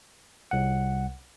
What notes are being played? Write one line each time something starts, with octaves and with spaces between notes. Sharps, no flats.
C2 F#5